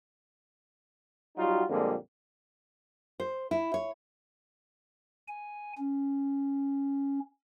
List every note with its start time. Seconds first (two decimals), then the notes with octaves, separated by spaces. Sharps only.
1.37 F#3 G3 D#4 F4 F#4
1.69 F2 A#2 D3 G3 G#3 A#3
3.20 C5
3.51 E4
3.74 C#5
5.28 G#5
5.78 C#4